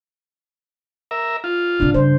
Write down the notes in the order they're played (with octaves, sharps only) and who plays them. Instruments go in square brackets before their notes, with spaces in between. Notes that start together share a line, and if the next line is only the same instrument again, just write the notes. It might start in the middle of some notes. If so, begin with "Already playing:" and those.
[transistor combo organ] A#4 E5
F4
[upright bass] A2 C3 [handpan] D4
[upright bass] G2 C#3 [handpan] C5